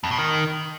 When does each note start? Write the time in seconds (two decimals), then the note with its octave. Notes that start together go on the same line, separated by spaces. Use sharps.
0.04 F2
0.11 B2
0.18 D#3